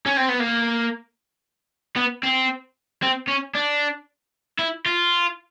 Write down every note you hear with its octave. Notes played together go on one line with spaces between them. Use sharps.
C#4
C4
B3
A#3
B3
C4
C4
C#4
D4
E4
F4